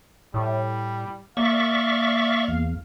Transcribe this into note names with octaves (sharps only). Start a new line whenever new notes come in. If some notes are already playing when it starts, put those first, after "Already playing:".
A2 G3
A#3 D5 E5 F5 C#6
E2